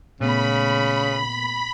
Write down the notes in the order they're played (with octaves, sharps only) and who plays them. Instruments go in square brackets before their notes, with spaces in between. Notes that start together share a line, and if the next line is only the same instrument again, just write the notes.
[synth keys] A#2 A3 B3 [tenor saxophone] C#3 [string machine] B5